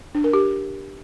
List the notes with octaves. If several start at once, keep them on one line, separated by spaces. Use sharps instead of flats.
D4
A#4
G4